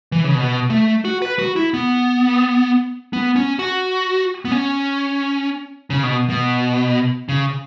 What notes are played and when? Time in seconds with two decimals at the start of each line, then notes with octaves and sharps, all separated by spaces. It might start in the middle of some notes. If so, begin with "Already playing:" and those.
0.12 E3
0.24 C#3
0.35 B2
0.70 A3
1.05 F#4
1.22 B4
1.39 F#4
1.56 E4
1.74 B3
3.13 B3
3.36 C#4
3.59 F#4
4.45 B3
4.52 C#4
5.90 C#3
6.03 B2
6.30 B2
7.29 C#3